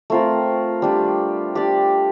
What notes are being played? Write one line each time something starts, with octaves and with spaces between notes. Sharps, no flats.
A3 C4 F4 A#4
G3 D4 G4
D4 G4 D5